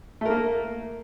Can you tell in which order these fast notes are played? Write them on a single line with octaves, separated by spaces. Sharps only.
A3 A#4 A#3